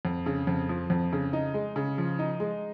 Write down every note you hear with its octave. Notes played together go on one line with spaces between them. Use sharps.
F2
C#3
F2
F3
F2
C#3
D#4
G#3
C#3
F3
D#4
G#3